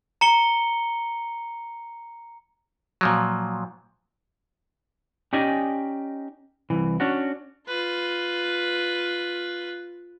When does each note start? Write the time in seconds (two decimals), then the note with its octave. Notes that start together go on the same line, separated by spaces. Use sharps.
0.21 A#5 C#7 G7
3.01 A#2 F3 F#3
5.33 C#4 D#4 G4 D5 D#5 G#5
6.70 C2 E3
7.00 C#4 D4 F#4
7.68 F4 B4